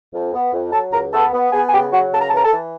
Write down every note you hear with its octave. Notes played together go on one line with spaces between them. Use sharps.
F2
B3
F2
F#3 A4 A5
C#2 A#4 A#5
B3 A4 A5
B3
B3 G#4 G#5
G#5
C#3 G4 G5
F#3 F#4 F#5
C#3 A5
A#5
A5
E3 A#5
A4 A5
E3